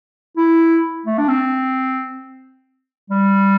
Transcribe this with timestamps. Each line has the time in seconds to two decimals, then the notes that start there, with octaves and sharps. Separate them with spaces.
0.37 E4
1.06 A3
1.18 D4
1.28 C4
3.10 G3